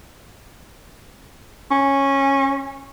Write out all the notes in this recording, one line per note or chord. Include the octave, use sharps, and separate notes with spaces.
C#4